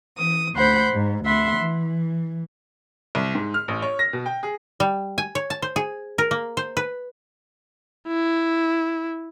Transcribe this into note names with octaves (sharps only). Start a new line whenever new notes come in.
E3 D#6
D2 C5 F#5 B5 G6
G#2
D2 E5 F#5 B5 C6
E3
C2
G#2
F6
A1
C#5
A#6
B2
G5
G#4
G3
G#5
C#5
A5
C5
G#4
A#4
A#3
C5
B4
E4